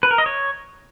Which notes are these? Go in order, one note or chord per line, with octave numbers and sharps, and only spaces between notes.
B4
A#4
D#5
C#5